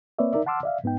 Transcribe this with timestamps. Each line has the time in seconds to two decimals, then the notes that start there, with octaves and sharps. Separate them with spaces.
0.19 A#3 C4 B4 C#5 D5 E5
0.32 D#4 A#4 D5 E5
0.46 F#5 A5 C6 D6 E6 F6
0.63 D5 E5 F5
0.84 G#2 B3 D#4 G5